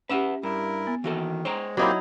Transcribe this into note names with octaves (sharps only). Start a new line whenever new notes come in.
C#4 G4 B4 E5 F#5
G2 E4 A#4
B3
D#3 E3 F#4 A4
G#3 C5 C#5 G5 A#5 C#6
F#3 A#3 C4 D#4 E4 G4